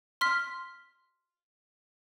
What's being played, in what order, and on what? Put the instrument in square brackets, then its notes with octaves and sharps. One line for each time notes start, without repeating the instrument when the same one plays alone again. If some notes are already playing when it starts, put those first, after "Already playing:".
[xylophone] C6 F6 B6